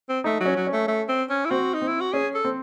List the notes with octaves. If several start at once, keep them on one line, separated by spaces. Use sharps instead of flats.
C4
A3 D#4
F#3
C#4
F#3
C#4
A3
A3
C4
C#4
E4
C4 F#4
D#4
C4
E4
F#4
C#4 G#4
A4
C4